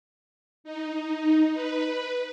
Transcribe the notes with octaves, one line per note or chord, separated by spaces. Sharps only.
D#4
B4